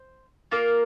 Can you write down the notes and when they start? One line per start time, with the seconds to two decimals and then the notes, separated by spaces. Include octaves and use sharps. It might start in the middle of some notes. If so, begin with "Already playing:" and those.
Already playing: C5
0.51 A#3 F4 A#4